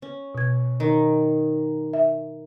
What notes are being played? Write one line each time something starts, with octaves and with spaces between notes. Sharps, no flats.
C#4
B2 G#6
D#3
E5